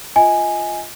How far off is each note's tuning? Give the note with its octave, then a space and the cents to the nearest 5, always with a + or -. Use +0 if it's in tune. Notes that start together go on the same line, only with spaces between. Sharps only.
F4 +0 D#5 +30 G#5 +0